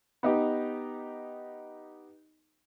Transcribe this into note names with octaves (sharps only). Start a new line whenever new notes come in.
B3 D#4 G4